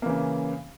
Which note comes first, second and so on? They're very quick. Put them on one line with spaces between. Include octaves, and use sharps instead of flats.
A#3 E3 C#3